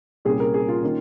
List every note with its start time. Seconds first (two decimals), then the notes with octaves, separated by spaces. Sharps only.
0.25 C2 A#2 G3 C#4 G#4
0.40 A#4
0.54 G#4
0.68 F4
0.83 D#3 A#3 C#4